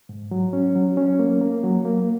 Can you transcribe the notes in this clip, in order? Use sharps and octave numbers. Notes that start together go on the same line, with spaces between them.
G#2
F#3
C#4
F#3
C#4
A#3
A#3
F#3
A#3